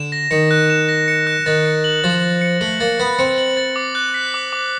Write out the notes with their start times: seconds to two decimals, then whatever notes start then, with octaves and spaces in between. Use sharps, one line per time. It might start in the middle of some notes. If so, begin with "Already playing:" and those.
Already playing: D3 E7
0.12 A#6
0.31 D#3 C#7
0.51 F#6
0.70 E7
0.89 A#6
1.08 C#7
1.27 F#6
1.46 D#3 A6
1.66 C#7
1.84 F#7
2.04 F3 A6
2.23 A6
2.41 C#7
2.61 A3 F#7
2.80 A#3 A6
2.99 B3 A6
3.19 C4 C#7
3.38 F#7
3.57 A6
3.76 D6
3.95 F#6
4.14 B6
4.34 D6
4.53 D6